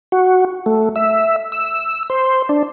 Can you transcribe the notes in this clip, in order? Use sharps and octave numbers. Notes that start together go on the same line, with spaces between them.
F#4
A3
E5
E6
C5
D4